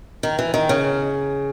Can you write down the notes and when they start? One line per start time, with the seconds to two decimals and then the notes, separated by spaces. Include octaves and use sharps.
0.23 D#3
0.39 E3
0.54 D#3
0.69 C#3